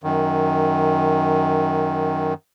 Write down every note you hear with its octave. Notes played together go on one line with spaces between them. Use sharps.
F#2 D#3